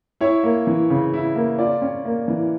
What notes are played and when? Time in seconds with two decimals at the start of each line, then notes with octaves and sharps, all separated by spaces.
0.21 E4 C#5
0.43 A#3
0.67 E3
0.90 C#3
1.14 E4
1.35 A#3
1.59 F4 D5
1.82 C#4
2.05 A#3
2.28 E3